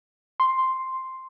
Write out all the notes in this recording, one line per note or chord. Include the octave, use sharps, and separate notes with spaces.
C6